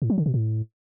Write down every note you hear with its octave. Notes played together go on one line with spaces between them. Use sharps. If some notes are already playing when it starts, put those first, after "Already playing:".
A2
F#3
D3
B2
A2